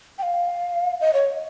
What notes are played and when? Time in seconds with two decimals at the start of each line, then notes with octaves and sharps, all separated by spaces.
0.18 G5
0.23 F5
1.01 D#5
1.13 C#5